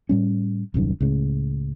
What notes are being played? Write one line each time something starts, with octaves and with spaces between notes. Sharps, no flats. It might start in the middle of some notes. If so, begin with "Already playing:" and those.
A2 G3 C#4
D#1 C2 F#2 D#3
C#2 A2 C#3